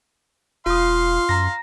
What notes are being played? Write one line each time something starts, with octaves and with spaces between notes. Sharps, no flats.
E1 F4 F5 C6 D#6
F#2 A#5 A#6